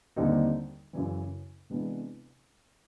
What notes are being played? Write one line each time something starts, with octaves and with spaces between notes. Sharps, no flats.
D#2 D3 G3 C4 D#4
F#2 C#3 E3
C3 E3 G#3 B3 D4